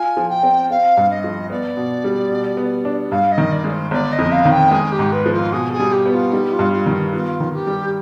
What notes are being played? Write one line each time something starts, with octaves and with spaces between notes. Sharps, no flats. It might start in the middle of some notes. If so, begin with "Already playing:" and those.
Already playing: F4 G#5
F3
G5
C4
C4 F5
G2
D#5
F3
B3 D5
B2
G3
B2
B3
D4
G2 F5
D#5
D#3
D5
G#3
C5
G1 D5
D#5
F2
F5
D#3
G5
G#3 G#4
G4
G#2
B4
F3
F4
B2 G#4
G#4
G3
G4
B3
F4
G3 D#4
F4
G2
F4
D#3
D#4
B3 F4
D#3
G4
G3